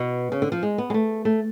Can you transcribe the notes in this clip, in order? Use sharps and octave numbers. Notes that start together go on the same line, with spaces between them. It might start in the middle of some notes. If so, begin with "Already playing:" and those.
Already playing: B2
C#3
D3
F3
G#3
B3
G#3
A3
A3